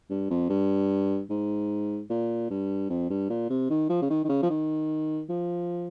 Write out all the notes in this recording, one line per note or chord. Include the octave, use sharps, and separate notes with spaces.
G2
F2
G2
G#2
A#2
G2
F2
G2
A#2
C3
D#3
F3
C#3
D#3
D#3
C#3
F3
D#3
F3